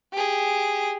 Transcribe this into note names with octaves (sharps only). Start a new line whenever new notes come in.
G4 G#4